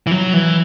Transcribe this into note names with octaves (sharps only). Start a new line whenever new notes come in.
E3
F#3
E3